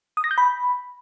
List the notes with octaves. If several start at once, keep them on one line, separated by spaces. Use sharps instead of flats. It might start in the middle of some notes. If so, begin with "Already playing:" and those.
D#6
A#6
G6
B5